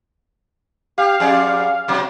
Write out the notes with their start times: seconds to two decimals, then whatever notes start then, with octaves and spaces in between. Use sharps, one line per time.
0.98 G4 F5
1.20 F2 G#4 D5
1.88 G#2 B2 F#3